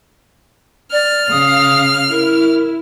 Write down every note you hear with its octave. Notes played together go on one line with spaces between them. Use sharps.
D5 F6
C#3 F5 D#6
E4 A#4